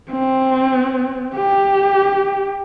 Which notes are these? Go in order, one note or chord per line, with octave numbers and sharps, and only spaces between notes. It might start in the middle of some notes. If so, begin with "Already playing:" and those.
C4
G4